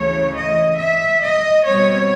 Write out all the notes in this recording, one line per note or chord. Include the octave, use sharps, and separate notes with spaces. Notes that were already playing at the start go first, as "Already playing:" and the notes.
Already playing: D2 C#3 E3 A3 C#5
D#5
E5
D#5
B2 G3 C4 C#5